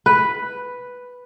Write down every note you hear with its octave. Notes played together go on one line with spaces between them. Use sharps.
B4